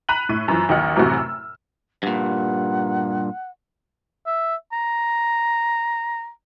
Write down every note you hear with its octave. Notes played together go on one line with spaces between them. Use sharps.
A#5 B5 F#6 B6 D#7 F#7
A2 D#7
F#2 E3 F3
A1 D#2 F#3 D#5 F#5 F6
F#2 A2 C3 E3 A3 F#4
E6
G2 A#2 F#5
E5
A#5